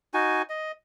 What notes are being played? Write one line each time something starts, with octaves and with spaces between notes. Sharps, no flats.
D#4 F#4 G#5
D#5